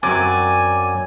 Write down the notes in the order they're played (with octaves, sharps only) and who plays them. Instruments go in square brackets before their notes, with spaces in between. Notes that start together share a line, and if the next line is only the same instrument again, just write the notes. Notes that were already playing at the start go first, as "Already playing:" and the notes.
[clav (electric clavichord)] F#2 F#3 C4 [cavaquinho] D5 [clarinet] G#5